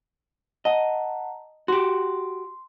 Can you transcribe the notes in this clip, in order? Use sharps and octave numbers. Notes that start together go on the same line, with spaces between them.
D#5 F#5 A5 A#5
F#4 G4 C6